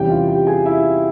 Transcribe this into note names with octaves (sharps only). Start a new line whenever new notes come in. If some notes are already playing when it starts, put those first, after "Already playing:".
Already playing: E2 C3 E3 G3 C#4 G4 G5
F4 F5
G4 G5
G#4 G#5
E4 E5